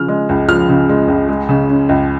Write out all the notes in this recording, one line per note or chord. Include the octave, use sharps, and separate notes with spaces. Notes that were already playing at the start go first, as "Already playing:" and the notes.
Already playing: C#3 F3 F6
G#3
C#2
F3 F6
C#3
G#3
C#2
G#3
C#3
C#4
C#2